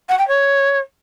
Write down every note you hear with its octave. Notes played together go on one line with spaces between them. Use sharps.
F#5
G5
C#5